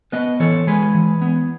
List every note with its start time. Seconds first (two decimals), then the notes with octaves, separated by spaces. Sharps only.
0.12 B3 B4 D#5
0.40 E3 A4 C#5
0.67 G#3 G#4 B4
0.94 E3
1.22 B3